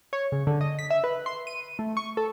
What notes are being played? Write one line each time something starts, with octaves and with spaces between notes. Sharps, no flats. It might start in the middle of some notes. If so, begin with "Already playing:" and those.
C#5
C#3
D3
D#5
B6
E5
B4
C6
D#7
A3
C#6
A4